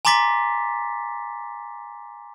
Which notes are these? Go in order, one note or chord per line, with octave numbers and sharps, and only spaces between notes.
G#5 A#5 C6 D6 A6 B6